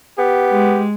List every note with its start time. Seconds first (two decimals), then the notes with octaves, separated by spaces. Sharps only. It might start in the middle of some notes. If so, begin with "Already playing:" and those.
0.19 B3 G4
0.51 G#3